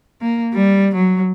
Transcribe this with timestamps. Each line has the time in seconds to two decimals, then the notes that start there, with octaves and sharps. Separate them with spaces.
0.21 A#3
0.54 G3
0.95 F#3